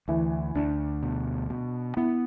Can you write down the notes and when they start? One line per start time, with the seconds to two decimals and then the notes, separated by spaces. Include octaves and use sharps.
0.08 D2 E3
0.55 D2 D4
1.03 B2
1.50 B2
1.97 B3 E4